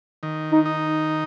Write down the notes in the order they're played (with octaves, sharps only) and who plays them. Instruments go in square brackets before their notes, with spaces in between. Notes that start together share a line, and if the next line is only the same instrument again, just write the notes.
[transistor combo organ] D#3
[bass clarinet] D#4
[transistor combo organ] D#4